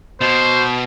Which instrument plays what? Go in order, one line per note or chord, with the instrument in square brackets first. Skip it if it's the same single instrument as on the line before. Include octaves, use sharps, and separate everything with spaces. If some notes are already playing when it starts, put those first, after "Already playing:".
[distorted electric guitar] B2 [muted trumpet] C5